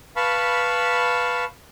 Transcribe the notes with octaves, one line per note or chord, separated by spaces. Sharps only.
B4 F5 A5 B5 C#6